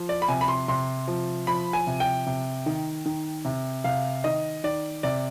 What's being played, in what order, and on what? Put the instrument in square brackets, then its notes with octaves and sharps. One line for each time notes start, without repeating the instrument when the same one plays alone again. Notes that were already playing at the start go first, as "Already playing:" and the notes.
Already playing: [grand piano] F3
D5
B5
C3 G#5
B5
C6
C3 C6
F3
F3 B5
G#5
C3
G5
C3
D#3
D#3
C3
C3 F5
D#3 D#5
D#3 D5
C3 D5